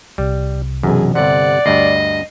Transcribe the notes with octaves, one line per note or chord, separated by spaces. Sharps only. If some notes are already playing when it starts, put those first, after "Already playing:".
C2 C3 G3
B1 F#2 C3 E3 G#4
G1 C3 C5 D5 F#5
D2 G2 D#5 C7